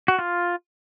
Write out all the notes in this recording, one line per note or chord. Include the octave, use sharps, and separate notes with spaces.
F#4
F4